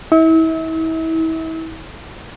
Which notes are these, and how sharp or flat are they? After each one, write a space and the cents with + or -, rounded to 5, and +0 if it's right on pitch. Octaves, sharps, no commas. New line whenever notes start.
E4 -35